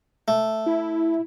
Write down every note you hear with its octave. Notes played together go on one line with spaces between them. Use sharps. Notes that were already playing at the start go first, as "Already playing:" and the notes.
A3
E4